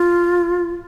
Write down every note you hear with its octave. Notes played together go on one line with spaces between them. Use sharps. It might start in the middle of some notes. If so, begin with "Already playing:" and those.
Already playing: F4